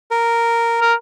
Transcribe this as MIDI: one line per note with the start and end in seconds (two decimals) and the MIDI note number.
0.11 0.80 70
0.81 0.93 70